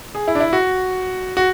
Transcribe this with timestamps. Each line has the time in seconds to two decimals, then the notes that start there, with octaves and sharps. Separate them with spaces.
0.15 G#4
0.28 E4
0.35 D4
0.40 E4
0.53 F#4
1.37 F#4